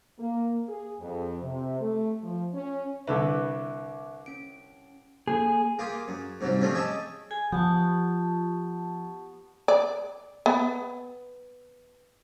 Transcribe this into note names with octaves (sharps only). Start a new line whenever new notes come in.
A#3
G#4
F2
C3
A3
F3
C#4
C2 D3 B4 E5 C#6 D6
C#4 D7
A#3 G#4 A4
A#3 F4 G4 G#4
F#2
G#2 C3 F#3 G3
F3 G3 A3 C4 C#4
G4 G#4 C#5 D#5 E5 A5
G#4 G#5
F3 B3 G4 A5 C#6
D5
B3